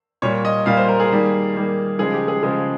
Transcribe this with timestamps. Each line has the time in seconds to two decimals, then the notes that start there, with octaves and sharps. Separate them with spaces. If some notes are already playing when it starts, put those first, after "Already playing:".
0.22 A#2 G3 A#3 C#5
0.45 D#5
0.66 A#2 G3 A#3 F5
0.77 C5
0.88 A#4
1.00 G#4
1.11 D#3 G3 A#3
1.54 D#3 G3 A#3
1.99 C#3 F3 G#3 G#4
2.13 G4
2.28 G#4
2.43 C#3 F3 G#3 G#4